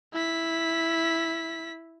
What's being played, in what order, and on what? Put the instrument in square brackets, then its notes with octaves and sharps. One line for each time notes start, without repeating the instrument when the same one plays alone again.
[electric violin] E4 B6